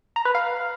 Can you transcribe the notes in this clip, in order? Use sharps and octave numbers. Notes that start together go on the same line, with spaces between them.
A#5
B4
F5